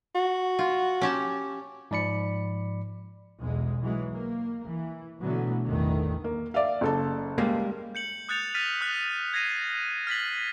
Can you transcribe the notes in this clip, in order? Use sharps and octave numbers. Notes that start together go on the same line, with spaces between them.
F#4
F4
C#4 G4 A5
G#2 F3 D5 B5 C#7
B1 E2 G#3
E3 F#3 G#3
A#3
E3
B2 D3 E3 F#3 A3 B3
A1 E2 D3 D#3 A3
A#3
D5 E5 F5
F#1 A4 A5
G3 G#3 A#3
G6 C#7 F#7
D#6 F#6 G6 A6 C#7 F7
F6 A6 B6 D#7
D#6 F#6
G#6 A#6 C7 D#7
F6 A6 B6 F#7